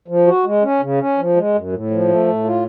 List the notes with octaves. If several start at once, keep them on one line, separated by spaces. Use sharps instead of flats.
F3
F#4
G#3
C#4
C#3
C#4
F3
G#3
F#2
A2
F3
A3
A2
F4